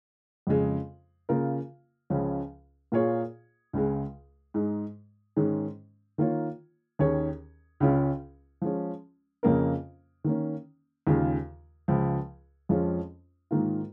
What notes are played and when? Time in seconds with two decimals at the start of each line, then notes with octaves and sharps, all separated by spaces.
0.47 F2 C#3 G#3
1.29 C#3 A#3 F4 A#4
2.10 C#2 C#3 F3 C#4
2.92 A#2 A#3 F4 G#4 C#5
3.73 C#2 C#3 G#3
4.54 G#2 G#3 D#4
5.36 G#2 D#3 G#3 C#4
6.18 D#3 A#3 F4 C#5
6.99 D#2 D#3 C#4 G#4 C#5
7.80 C#2 C#3 G#3 C#4 F4
8.62 F3 G#3 C#4
9.43 F2 C#3 A#3 C#4 A#4
10.24 D#3 A#3 C#4
11.07 D#2 C#3 G#3 F4
11.88 C#2 C#3 F3
12.69 F2 F3 G#3 C#4 F4
13.51 G#2 D#3 A#3 F4